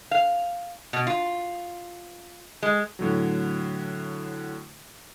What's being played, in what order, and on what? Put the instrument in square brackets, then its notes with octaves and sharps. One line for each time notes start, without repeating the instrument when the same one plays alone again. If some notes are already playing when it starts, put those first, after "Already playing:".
[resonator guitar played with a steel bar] F5
B2
F4
G#3
[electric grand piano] A2 D3 F#3